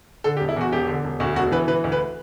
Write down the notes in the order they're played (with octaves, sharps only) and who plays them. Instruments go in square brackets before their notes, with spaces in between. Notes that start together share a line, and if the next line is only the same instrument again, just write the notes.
[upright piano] D3 A4
G4
E1
E4
E2 F#4
E1 G4
D3
E1
D2 F#4
E1 F#4
E3 B4
E3 B4
D2
B4